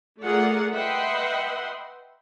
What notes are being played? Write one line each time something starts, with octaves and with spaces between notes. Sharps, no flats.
A3 F4 G#4 A#4 D5 F#5
B4 D#5 E5 F#5 G5 C6